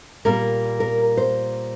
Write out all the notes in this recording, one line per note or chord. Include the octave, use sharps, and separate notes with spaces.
A#2 G3 A#3 A#4
A#4
C5